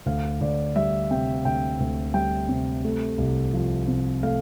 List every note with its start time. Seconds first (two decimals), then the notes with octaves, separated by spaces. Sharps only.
0.06 D2 F5
0.41 D2 D5
0.76 G3 E5
1.11 C3 G5
1.45 D2 G5
1.80 D2
2.14 G3 G5
2.49 C3
2.85 A3
3.18 C2
3.54 F3
3.88 C3
4.23 A3 F5